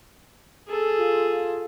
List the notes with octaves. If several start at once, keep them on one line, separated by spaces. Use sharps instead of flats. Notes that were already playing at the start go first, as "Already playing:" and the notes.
G#4 A4
F4